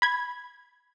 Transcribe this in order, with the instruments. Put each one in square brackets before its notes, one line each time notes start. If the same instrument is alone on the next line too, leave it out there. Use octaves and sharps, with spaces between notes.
[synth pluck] B5 G#6